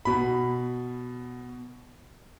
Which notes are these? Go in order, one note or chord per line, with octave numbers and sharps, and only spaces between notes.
B2 B5